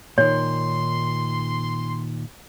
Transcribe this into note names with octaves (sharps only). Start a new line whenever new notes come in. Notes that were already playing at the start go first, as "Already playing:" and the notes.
A#2 D#3 C#5 C6